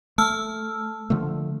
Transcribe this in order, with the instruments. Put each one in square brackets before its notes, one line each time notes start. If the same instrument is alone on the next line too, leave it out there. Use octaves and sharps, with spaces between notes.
[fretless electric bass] A3 [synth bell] A5 E6 F6
[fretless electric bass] D3 F3 A3